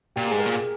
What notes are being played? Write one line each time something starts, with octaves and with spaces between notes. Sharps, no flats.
A#2 G4
G#2 G#4
A#4
A#2
G#4